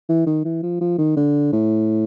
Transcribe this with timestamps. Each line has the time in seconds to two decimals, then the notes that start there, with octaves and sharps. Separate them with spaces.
0.09 E3
0.26 D#3
0.45 E3
0.63 F3
0.81 F3
0.98 D#3
1.17 D3
1.53 A2